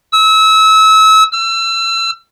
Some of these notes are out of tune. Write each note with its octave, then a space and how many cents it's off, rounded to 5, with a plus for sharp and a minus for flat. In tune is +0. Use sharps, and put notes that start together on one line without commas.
E6 -30
E6 +35